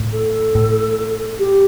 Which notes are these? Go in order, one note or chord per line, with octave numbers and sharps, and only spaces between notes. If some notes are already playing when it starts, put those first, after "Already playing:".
Already playing: A2
A4
A2
G4